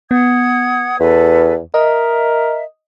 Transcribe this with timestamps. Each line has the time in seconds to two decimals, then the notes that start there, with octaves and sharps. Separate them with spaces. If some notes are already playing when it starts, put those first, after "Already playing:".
0.11 B3 F#5 D#6 G#6
1.00 E2 A4 B4
1.74 A#4 D#5 E5